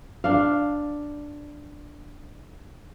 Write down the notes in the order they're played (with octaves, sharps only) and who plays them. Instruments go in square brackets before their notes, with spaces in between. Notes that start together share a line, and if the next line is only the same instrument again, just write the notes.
[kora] D4 F5